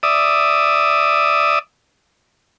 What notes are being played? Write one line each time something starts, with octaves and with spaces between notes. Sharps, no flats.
D5 E5 D#6